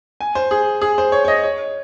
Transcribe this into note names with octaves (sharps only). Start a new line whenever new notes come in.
G#5
C5
G#4
G#4
C5
C#5
C#5
D#5
C#5